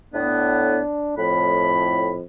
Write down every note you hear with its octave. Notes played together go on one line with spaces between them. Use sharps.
A2 B3 D4
F2 A2 B5